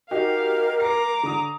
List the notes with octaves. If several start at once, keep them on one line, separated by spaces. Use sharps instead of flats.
D#4 F#4 G4 A#4 F5
A#5 D6 C7
D3 D#6